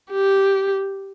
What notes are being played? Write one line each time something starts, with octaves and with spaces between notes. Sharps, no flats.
G4